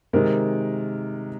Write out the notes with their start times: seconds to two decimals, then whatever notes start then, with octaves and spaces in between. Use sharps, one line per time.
0.13 C3 D#3 G#3 A#4